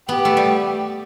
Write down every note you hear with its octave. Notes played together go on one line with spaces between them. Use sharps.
B3 G4
A3
G3